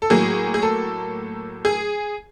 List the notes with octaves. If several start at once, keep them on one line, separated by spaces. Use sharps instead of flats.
A4
A2 F#3 A#3 G#4
G#4
A4
G#4